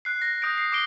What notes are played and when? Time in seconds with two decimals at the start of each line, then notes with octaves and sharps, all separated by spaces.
0.05 F#6 C7
0.22 A#6
0.42 D#6 G6 A#6 D7
0.58 C7
0.72 D6 C7 D7 G7